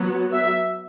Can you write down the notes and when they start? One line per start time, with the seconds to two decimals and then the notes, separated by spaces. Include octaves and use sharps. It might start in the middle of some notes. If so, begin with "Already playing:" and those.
Already playing: F#3 B3
0.34 E5